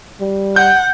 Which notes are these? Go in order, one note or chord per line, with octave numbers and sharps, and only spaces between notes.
G3
F#5 G6